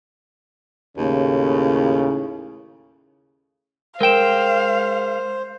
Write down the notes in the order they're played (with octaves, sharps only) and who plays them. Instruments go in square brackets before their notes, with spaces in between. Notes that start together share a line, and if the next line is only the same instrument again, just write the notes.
[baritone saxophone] D#2 [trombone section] A2 C#3
[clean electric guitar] G#3 G5 [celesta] A#4 E7 [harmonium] C5 [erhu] F5